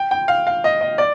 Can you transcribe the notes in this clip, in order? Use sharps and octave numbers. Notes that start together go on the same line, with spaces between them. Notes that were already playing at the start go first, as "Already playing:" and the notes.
Already playing: G5
G5
F5
F5
D#5
D#5
D5